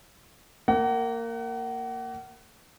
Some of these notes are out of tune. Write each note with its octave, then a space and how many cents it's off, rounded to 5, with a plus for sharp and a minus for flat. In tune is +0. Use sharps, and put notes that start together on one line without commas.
A#3 -15 F#5 +35